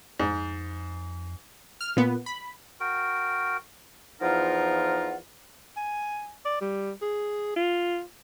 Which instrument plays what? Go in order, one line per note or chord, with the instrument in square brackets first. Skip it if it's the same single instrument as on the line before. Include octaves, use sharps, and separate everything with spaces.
[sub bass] F2 [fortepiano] G#2
[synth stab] F6
A#2 B3
B5
[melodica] F#4 A#4 G5
[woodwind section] E2 F3 D#4 F4 A#4 F#5
[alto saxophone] G#5
D5
G3
G#4
F4